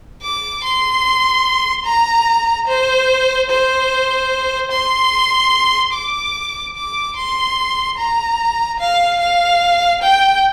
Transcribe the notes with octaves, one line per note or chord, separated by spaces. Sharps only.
D6
C6
A#5
C5
C5
C6
D6
D6
C6
A#5
F5
F5
G5